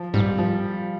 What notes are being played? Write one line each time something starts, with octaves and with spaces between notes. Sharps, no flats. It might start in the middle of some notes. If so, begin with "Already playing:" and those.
Already playing: F3
G#2 G3
F3